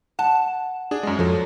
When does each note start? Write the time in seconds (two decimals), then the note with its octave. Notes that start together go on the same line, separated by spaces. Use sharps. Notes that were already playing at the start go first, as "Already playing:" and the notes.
0.19 F#5 A5
0.91 D4 G#4
1.03 F#2 G#3
1.19 F2 F3 F#3 A4